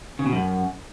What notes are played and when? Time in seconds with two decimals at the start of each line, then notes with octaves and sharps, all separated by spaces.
0.19 C#3
0.26 B2
0.33 F#2